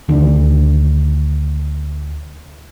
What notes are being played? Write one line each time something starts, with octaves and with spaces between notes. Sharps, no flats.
D2 D#3 D4